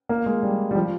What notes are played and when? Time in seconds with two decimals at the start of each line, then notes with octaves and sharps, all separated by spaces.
0.09 A#3
0.26 G#3
0.43 G3
0.71 G3
0.75 F3